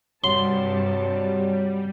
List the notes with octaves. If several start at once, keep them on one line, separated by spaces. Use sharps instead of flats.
G2 C3 F#3 G3 A5 C6